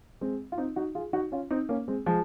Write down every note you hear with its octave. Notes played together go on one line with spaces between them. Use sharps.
G#3 C4
F4
C4 D#4
D#4 F#4
F4 G#4
D#4 F#4
C#4 F4
C4 D#4
A#3 C#4
G#3 C4
F3 G#3